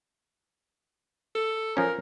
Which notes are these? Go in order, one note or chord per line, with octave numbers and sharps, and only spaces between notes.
A4
F3 C#4 A#4